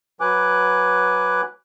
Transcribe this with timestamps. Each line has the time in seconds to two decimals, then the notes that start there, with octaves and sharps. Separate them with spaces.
0.21 F#3 B4 G#5 D6 F#6